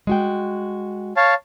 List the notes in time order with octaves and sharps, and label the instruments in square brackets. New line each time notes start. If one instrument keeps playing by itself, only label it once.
[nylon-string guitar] G#3 F#4 G5
[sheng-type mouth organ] C#5 F5 A5